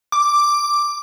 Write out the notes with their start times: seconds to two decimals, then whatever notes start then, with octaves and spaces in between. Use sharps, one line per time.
0.12 D6